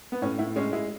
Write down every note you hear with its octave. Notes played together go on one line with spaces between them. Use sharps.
B3
A2 C#4
A2 E4
G#3 C#4
G#3 E4